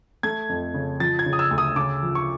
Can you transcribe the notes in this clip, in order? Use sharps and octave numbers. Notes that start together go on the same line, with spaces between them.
A3 G#6
F2
C#3
F3 A6
G#6
C#3
D#6
E6
D2
D#6
C#3 D6
F3
C#6